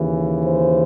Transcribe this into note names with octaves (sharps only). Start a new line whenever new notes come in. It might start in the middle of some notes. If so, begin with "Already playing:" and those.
Already playing: D#2 C#3 E3
C5